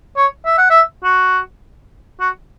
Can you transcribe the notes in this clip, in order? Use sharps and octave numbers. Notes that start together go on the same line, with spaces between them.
C#5
E5
F#5
E5
F#4
F#4